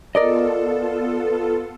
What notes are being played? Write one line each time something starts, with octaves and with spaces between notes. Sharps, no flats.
B3 F4 A4 A#4 D5 D#5